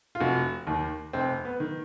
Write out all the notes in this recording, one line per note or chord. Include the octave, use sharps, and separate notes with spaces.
F4
F1 F#4
D#2 D#3
F1 C4
B3
D#3